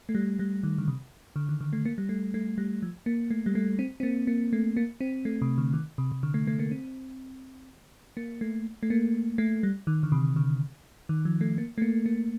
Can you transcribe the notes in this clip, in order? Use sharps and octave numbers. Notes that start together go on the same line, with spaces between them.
A3
G3
G3
D#3
D3
C3
D3
D#3
D3
A3
A#3
G3
A3
A3
G3
F3
A#3
A3
G3
A3
C4
C4
A#3
A#3
A3
A#3
C4
A3
C3
D3
D#3
C3
C3
D3
A3
A3
A#3
C4
A#3
A3
A3
A#3
A3
G3
D#3
D3
C3
D3
D#3
F3
A3
A#3
A3
A#3
A#3